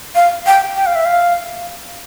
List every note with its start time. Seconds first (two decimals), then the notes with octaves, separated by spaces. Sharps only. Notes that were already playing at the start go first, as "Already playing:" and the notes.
0.15 F5
0.46 G5
0.76 G5
0.86 F5
0.95 E5
1.05 F5